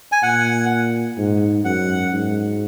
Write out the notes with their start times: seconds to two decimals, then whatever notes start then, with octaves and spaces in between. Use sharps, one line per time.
0.12 G#5
0.23 A#2 F#5
1.18 G#2
1.64 F#2 F#5
2.13 G#2